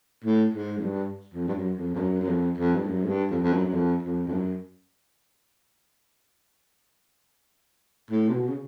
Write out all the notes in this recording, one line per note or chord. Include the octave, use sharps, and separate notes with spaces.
A2
G#2
F#2
G2
F2
G2
F#2
F2
F2
F#2
F#2
F2
F2
G2
F#2
G#2
G2
F2
F2
F#2
F#2
F2
F2
F2
F#2
A2
C3
B2
C#3